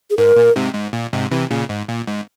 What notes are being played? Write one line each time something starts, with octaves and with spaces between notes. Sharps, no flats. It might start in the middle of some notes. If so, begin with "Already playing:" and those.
G#4
G#2 A#4
A#2
G#2 C3
G#2
A#2
G#2 C3
C3 E3
A#2 C#3
G#2
A#2
G#2